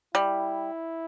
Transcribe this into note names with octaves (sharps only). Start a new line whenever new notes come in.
G3 E4